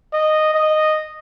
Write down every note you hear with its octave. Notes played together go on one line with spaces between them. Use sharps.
D#5
D#5